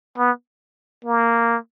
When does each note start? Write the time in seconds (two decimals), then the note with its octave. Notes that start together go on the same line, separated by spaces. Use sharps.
0.18 B3
1.05 A#3